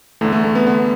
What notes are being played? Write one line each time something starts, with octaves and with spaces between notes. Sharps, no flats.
E2 D3 A3
A3
A3
B3
D3 B3